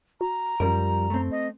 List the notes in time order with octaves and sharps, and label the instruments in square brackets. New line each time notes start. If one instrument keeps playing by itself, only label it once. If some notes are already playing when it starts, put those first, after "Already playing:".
[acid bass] F#4 [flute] A#5
[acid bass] F#2 [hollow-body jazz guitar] F3 G3 A#4
[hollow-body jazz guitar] A3 C4
[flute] D#5